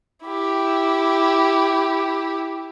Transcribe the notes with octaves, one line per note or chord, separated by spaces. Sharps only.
E4 G4